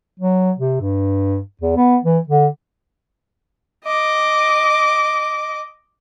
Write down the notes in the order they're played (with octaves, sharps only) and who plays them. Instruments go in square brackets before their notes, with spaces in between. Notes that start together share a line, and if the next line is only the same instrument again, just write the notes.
[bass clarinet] F#3
C3
G2
E2
B3
E3
D3
[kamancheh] D#5 D6